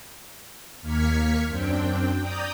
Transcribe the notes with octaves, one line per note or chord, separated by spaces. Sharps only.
D#2 A#3 F6 G#6 B6 C#7
F#2 C4 D4 G5
D5 G5 A#5 D#6 G6